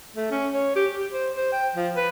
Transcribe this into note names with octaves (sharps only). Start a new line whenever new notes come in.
A3
C#4
C#5
G4
G4
C5
C5
G5
F3
B4